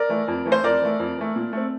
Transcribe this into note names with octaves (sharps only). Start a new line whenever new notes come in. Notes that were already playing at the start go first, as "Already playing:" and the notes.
Already playing: A#4 D5
E3 A3
F2
E3 A3
C5
F2 A#4 D5
E3 A3
F2
E3 A3
A#2
A3 C4